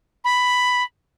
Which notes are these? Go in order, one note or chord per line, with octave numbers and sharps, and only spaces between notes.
B5